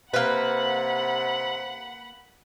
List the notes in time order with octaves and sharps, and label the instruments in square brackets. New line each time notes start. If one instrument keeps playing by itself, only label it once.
[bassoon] C3 [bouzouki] A#3 B4 [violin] F#5 B5